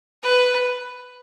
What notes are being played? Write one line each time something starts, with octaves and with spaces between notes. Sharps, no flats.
B4